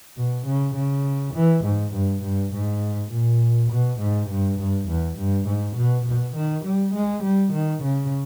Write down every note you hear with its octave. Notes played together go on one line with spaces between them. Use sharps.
B2
C#3
C#3
E3
G#2
G2
G2
G#2
A#2
B2
G#2
G2
G2
E2
G2
G#2
B2
B2
D#3
G3
G#3
G3
D#3
C#3